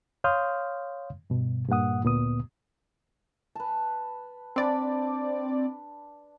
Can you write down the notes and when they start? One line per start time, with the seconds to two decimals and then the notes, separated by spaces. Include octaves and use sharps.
0.24 C#5 F5 C6 D#6 F6 G6
1.30 G2 B2
1.68 G2 A#2 A#3 F#5 D#6
2.03 D2 A#2 B3 D#6
3.55 B4 A5
4.56 C4 D4 D5 B5